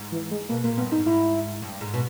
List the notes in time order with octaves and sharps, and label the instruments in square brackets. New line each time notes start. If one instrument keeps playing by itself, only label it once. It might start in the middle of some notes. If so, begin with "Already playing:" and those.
Already playing: [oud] G#2
[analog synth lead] E3
G#3
[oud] B2 [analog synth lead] A#3
[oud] A#2 [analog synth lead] A#3
[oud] G2 [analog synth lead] B3
[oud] G#2 [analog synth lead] D#4
[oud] G#2 [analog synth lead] E4
[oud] G2
G#2
B2